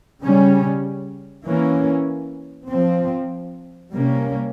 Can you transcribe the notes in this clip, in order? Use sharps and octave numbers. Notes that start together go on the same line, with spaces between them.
C#3 G3 C#4
E3 A#3 C#4
F3 C4
C3 G3 A#3 C#4